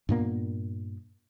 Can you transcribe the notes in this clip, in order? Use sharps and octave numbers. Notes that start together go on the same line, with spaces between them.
G2 A#2 A#3 B3